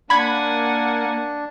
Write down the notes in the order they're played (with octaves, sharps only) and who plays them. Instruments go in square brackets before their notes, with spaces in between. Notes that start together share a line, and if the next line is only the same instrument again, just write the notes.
[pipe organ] A#3 [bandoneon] D4 [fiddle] F#5 G#5 [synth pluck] B5 G#6